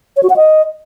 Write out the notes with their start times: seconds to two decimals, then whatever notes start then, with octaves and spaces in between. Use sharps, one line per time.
0.17 C#5
0.23 F#4
0.30 F#5
0.36 D#5